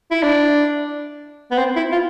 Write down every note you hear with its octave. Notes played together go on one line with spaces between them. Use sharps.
E4
D4
B3
C4
E4
F4